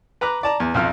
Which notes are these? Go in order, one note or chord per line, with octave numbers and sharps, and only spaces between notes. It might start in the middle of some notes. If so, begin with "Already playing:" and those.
B4 A#5 D6 F#6
D5 A5 A#5
E2
B1 F2 F6